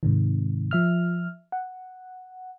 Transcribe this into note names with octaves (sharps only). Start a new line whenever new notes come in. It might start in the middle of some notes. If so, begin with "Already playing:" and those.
G#2 C3 D#3
F3 E5 F6
F#5